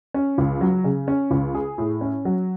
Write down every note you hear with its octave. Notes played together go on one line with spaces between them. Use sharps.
C#4
C#2
F#3
C#3
C#4
C#2
G#4
A2
C#4
F#3